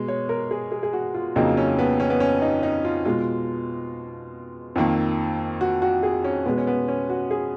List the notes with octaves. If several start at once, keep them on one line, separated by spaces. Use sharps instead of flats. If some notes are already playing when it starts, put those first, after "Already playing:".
Already playing: B2 G#3
C#5
A#4
G#4
G#4
G#4
F#4
F4
F2 C#3 F#3 A#3 D#4
C#4
B3
C#4
B3
C#4
D#4
D#4
F4
B2 G#3 F4
F2 D#3 A#3
F#4
F#4
G#4
C#4
B2 G#3 B3
C#4
B3
C#4
F#4
G#4